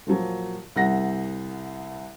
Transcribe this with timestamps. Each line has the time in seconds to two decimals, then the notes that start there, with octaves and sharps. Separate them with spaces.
0.07 A#2 F3 F#3
0.76 C2 F#5 A#6